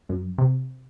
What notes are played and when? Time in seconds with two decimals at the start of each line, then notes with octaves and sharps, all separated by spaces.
0.09 F#2
0.38 C3